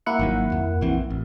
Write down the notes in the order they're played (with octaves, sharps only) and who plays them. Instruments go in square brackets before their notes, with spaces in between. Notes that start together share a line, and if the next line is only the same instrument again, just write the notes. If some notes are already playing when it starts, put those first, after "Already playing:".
[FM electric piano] A#3 E4 F#5
[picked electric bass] G#1 D#3 F#3
F2
A#1 E3 C4
A1